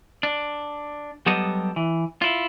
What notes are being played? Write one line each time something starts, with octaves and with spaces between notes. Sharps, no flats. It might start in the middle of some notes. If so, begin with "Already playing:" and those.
D4
F#3 G3 B3 G4 A4 D#5
E3
E4 F4